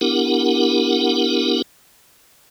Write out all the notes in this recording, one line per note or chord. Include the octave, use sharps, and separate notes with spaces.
B3 D4 E4 G4 A#4 F#5